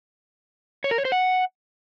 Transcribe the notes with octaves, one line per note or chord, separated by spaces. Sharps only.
C#5
A#4
C#5
C5
F#5